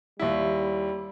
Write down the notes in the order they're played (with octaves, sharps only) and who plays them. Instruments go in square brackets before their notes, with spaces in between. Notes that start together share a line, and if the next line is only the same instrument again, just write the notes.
[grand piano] D#2 E4 [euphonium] G3